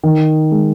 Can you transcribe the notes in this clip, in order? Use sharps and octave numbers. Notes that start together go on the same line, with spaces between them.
D#3
G#3